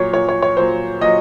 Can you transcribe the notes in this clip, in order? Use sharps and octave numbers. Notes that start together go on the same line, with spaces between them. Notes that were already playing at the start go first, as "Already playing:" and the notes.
Already playing: A#2 F#3 C#5
A#2 F#3 C#5
C#5
C#5
A#2 F#3 C5
A#2 F#3 D#5